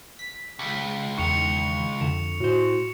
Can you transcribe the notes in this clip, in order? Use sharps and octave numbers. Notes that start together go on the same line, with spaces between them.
B6
C#2
E2 D#3 C#6 C#7 F7
F2 D3 E7
A2 F#4 C5